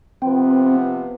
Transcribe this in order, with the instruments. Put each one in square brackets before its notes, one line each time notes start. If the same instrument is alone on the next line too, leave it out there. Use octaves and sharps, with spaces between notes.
[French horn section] C3 F3 B3 [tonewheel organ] C4